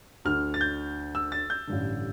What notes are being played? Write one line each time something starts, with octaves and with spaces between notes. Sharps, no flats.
D2 D3 F6
A6
G6
E6
A6
G6
A1 G2 D3